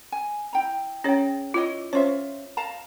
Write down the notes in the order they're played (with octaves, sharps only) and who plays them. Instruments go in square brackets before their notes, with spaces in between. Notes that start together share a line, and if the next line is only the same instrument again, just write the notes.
[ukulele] G#5
E4 G5 A#5
[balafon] C#4 C#5 [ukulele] G#4 G5
[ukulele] E4 C#5 D#5 [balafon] F4
[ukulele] C#4 F4 E5 [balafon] C5 C#5
[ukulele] F5 A5 A#5